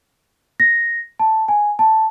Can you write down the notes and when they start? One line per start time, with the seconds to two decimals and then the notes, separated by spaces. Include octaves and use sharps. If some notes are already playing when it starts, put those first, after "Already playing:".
0.60 A#6
1.20 A5
1.48 G#5
1.79 A5